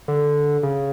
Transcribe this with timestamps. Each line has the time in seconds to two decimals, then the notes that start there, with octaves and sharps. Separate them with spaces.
0.08 D3
0.63 C#3